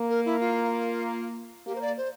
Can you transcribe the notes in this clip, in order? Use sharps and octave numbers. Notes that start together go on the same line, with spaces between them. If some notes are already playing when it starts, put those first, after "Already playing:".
Already playing: A#3
A#4
E4
F4
A#3 G4
C5
D5
C5